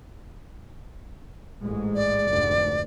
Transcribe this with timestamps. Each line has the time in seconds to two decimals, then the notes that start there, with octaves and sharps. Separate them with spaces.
1.62 A1 G#2 G#3
1.95 D5
2.27 F1 D2 G#2